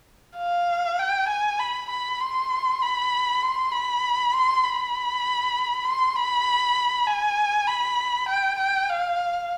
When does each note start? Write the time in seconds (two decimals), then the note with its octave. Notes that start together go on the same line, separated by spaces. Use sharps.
0.38 F5
0.99 G5
1.29 G#5
1.59 B5
1.89 B5
2.20 C6
2.82 B5
3.42 C6
3.72 B5
4.34 C6
4.64 B5
5.84 C6
6.16 B5
7.07 G#5
7.67 B5
8.28 G5
8.59 G5
8.89 F5